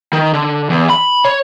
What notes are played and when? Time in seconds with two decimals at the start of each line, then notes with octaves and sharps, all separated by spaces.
0.13 D#3
0.33 D3
0.70 E2
0.90 B5
1.25 C#5